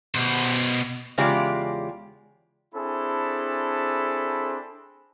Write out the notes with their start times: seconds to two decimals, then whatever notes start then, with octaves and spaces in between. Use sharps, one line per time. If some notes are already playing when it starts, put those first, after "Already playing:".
0.15 B2 C5
1.18 E2 C#3 G#3 F4 G4 D5
2.74 C4 D4 E4 G#4 A4 B5